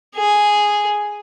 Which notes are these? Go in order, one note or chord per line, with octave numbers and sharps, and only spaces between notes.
G#4